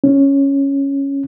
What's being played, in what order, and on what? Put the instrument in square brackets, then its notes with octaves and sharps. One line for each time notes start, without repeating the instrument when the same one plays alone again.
[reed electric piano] C#4